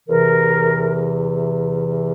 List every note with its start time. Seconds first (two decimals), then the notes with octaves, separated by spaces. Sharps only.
0.08 E2 C3 E3 A#4